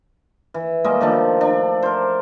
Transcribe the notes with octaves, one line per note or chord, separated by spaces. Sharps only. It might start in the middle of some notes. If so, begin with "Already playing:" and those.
E3
G3 G#3 A#3 D#5
D#3 F3 A3 D4
D4
A#4 C5